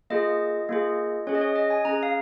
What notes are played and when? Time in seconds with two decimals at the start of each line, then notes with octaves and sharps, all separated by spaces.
0.10 A#3 F4 G#4 D#5
0.69 A#3 F4 G#4
1.27 C#4 G#4 C#5
1.35 D#5
1.41 C#5
1.56 D#5
1.70 G#5
1.85 C#4 G#4 A#5
2.03 F5